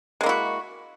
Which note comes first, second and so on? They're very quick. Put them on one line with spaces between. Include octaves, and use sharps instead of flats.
G#3 A#3 E4 F#4